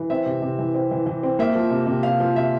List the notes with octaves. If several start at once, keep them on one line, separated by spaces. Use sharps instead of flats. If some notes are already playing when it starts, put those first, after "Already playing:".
Already playing: E3
C4 E5
C3
C3
E3
C4
E3
E3
C4
A#3 E5
F3
C3
C3
C3 F5
F3
C3 E5